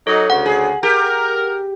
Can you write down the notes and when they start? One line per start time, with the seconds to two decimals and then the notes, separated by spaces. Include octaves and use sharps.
0.07 F#3 D#4 A4
0.30 D2 C#3 F#5
0.46 G#4
0.83 G4 A#4